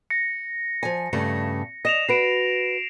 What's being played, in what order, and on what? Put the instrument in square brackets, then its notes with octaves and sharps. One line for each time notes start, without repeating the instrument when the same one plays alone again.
[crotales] A#6 C#7
[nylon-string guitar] F3 G#5
G2 C#3 A3
[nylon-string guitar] D#5 [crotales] A#6 E7 F7
[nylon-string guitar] F#4 B4 [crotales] C7 D7 E7